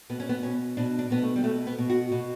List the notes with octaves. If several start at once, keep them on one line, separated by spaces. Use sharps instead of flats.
B2 B3
C#4
B3
B2 C#4
B2 D4
D4
B2 B3
A3
G3
B2 A3
B3
B2
F#4
B2